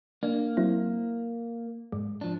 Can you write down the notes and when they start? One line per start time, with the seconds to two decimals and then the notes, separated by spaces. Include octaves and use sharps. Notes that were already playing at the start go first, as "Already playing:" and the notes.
0.23 A#3 D4
0.57 F#3 C4 E4
1.92 G#2 G#3
2.21 F3 D4